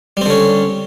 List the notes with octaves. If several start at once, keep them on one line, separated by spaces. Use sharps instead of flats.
D3 G3 C4 C#4